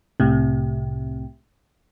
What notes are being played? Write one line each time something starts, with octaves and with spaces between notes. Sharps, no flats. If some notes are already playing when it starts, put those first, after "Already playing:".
C2 A2 C3